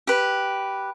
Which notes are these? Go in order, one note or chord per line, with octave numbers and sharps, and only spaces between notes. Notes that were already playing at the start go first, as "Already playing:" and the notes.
G4 B4